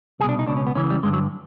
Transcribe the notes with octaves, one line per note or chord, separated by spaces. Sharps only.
C2 B2 D4 G#4
D#4
C#2 B2 D4
C#4
B3
C#2 C#3 E3 C#4
G3
G2 D3 G#3
F#3